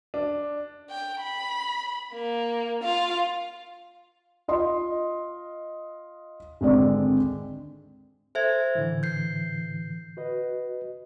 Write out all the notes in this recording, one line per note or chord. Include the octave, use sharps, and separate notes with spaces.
D4
G5
B5
A#3
F4 F5
F4 D#5 C6
G#1 D3 G#3 C4 D5
A4 C5 E5 G#6
A2 D3 E3
G6 C7
F#4 B4 D#5